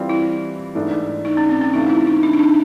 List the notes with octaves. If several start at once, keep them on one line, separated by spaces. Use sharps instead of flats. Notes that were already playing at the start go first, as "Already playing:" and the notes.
Already playing: E3 G3 C4 F4
E4
G#2 E3 A3 D4
D#4
C#4
C4
C#4
C3 E3 A3 C4 D#4 F4
E4
D#4
D4
D#4
D4